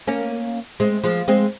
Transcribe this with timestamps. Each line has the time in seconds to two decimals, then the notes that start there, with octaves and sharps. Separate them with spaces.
0.07 A#3 C#4
0.80 G#3 C4
1.04 F3 G#3
1.28 G#3 C4